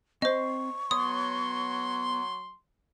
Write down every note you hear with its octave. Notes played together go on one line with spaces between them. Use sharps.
C4 C5 D#5 C6 C#6
F#3 B3 C#5 C6 D#6